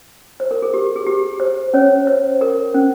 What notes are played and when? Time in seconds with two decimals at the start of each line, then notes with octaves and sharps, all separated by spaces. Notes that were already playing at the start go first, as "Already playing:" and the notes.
0.40 C5
0.51 A#4
0.62 G#4
0.74 G4
0.96 G#4
1.07 G4
1.40 C5
1.74 C#4 C#5
2.07 C5
2.41 A#4
2.74 C#4